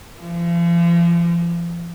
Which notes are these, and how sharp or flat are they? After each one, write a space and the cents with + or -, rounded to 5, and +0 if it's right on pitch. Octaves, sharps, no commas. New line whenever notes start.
F3 -40